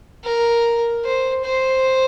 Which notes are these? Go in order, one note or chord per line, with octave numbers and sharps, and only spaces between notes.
A#4
C5
C5